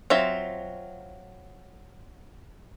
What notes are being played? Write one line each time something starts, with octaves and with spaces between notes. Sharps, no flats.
F#3 C4 F4 E5